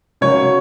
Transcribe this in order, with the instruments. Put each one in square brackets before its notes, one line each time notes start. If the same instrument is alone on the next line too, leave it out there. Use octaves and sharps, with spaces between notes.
[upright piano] C#3 F#3 C#4 F#4 A#4 [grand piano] C#5